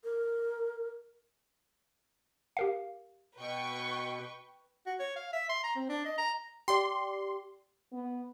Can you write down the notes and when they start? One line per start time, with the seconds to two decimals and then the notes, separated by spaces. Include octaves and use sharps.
0.04 A#4
2.57 G4 A#4 F5
3.38 B2 B4 G5 C#6
4.86 F#4
4.99 C#5
5.16 F5
5.33 E5
5.49 C6
5.63 A#5
5.76 C4
5.89 D4
6.05 D#5
6.18 A#5
6.68 G4 D5 C6
7.92 B3